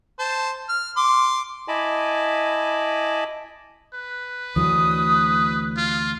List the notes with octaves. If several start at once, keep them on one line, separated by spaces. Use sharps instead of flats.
C5 A5
F6
C6 D6
E4 D#5 G#5 A5 B5 D6
B4
D2 E3 F#3 D#6
F4